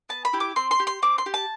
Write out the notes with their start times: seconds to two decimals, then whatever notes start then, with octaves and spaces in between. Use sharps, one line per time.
0.09 B3 A5
0.25 B5
0.33 E4 G4
0.40 D6
0.56 C4 C6
0.71 C6
0.80 G4
0.87 C6
1.02 C4 D6
1.18 C6
1.26 G4
1.34 A5